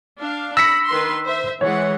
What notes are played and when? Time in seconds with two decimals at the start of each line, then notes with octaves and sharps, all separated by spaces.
0.19 D4 F5
0.57 B5 E6 A#6 B6 C#7
0.88 D#3 B4 C6
1.25 C5 E5
1.61 E3 G#3 C#5 F#5